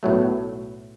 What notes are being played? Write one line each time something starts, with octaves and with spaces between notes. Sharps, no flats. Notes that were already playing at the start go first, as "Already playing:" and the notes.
B1 A2 F#3 A3